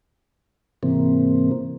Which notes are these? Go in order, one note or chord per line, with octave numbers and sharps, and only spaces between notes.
G#2 C3 E3 A#3 C4